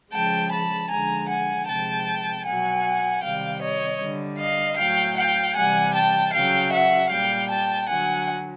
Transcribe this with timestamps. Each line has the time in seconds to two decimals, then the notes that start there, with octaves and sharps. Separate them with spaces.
0.11 C#3 F3 G#3 G5 A5
0.50 A5 B5
0.89 D3 F3 G#3 G#5 A#5
1.27 F#5 G#5
1.66 C3 F3 G#3 G5 A5
2.44 B2 F#3 F#5 G#5
3.21 C3 D#3 G3 F5 G5
3.60 C#5 D#5
3.99 D3 G3
4.38 D#5 F5
4.77 A2 F#3 F5 G5
5.16 F5 G5
5.55 C3 E3 G3 F#5 G#5
5.94 G5 A5
6.33 C#3 F#3 F5 G5
6.71 E5 F#5
7.10 A#2 G3 F5 G5
7.49 G5 A5
7.88 D3 F#3 F#5 G#5